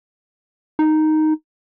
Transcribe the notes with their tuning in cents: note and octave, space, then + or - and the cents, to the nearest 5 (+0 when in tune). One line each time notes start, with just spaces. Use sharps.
D#4 +0